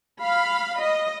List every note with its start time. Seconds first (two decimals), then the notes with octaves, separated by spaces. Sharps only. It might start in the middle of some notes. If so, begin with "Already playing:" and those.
0.21 F5 B5
0.81 D#5